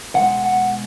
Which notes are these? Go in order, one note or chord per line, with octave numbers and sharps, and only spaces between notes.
B2 G#3 F#5
F#5